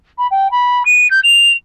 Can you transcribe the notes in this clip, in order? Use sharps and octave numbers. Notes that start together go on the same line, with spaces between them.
B5
G5
B5
D#7
G6
F7